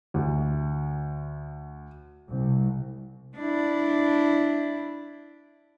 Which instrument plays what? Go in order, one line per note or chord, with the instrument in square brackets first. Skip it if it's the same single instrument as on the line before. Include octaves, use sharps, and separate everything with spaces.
[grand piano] D2
[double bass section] C2
[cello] D4 E4